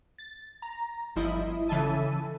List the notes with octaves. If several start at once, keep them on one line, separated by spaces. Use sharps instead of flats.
A6
A#5
G1 F3 E4 D#5
C#3 E3 A4 E5 A5 D#7